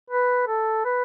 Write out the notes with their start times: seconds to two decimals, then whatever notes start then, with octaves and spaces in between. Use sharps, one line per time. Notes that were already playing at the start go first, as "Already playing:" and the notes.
0.10 B4
0.48 A4
0.85 B4